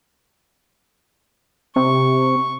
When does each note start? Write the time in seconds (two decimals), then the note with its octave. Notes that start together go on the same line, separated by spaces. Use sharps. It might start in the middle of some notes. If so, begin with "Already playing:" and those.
1.76 C3 C#6